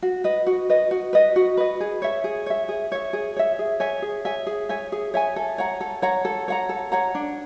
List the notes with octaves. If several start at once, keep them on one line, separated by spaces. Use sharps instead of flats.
F#4
B4 D#5
F#4
B4 D#5
F#4
B4 D#5
F#4
B4 D#5
G#4
C#5 E5
G#4
C#5 E5
G#4
C#5 E5
G#4
C#5 E5
G#4
C#5 E5 G#5
G#4
C#5 E5 G#5
G#4
C#5 E5 G#5
G#4
C#5 E5 G#5
A4
C#5 F#5 A#5
A4
C#5 F#5 A#5
A4
C#5 F#5 A#5
A4
C#5 F#5 A#5
D4